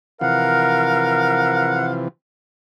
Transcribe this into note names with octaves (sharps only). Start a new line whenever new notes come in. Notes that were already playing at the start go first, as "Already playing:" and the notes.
C3 E3 F3 A#4 F5 F#5